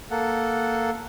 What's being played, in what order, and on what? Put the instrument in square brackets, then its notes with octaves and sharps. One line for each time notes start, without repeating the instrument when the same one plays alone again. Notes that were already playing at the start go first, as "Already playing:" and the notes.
[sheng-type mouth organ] A#3 A4 F#5